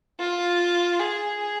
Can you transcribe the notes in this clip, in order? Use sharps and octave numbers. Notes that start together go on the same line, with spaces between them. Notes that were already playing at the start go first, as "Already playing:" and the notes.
F4
G#4